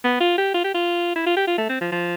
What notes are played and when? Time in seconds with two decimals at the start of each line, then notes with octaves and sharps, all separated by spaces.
0.04 B3
0.20 F4
0.38 G4
0.54 F4
0.64 G4
0.74 F4
1.16 E4
1.26 F4
1.36 G4
1.47 F4
1.58 A3
1.69 C4
1.81 F3
1.92 F3